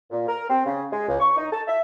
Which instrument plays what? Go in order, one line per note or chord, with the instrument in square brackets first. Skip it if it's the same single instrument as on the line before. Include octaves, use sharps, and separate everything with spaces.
[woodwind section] A#2
A#4
C4
C#3
G#3
C#2
C#6
D#4
A5
E5